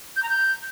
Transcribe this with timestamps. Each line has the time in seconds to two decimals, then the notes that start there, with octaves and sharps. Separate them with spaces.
0.16 G6
0.23 A#5
0.29 G6